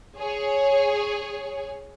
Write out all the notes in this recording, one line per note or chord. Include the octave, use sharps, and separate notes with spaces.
G#4 C#5